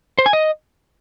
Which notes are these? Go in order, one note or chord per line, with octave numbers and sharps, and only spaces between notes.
C5
G#5
D#5